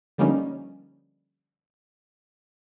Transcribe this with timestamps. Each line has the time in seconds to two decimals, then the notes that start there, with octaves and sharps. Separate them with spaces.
0.18 D3 F3 G3 A#3 C#4 D#4